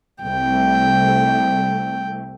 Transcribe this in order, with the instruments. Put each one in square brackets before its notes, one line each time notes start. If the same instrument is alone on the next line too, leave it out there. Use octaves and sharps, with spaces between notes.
[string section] C2 A3 [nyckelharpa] G5